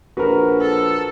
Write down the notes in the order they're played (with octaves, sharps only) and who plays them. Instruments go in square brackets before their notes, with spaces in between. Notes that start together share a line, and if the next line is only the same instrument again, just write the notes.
[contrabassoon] A#1 [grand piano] F#4 A#4 [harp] B4
[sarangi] A4